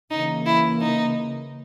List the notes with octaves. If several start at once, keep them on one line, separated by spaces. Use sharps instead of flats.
C#3 E3 A#3 D#4
E4
D#4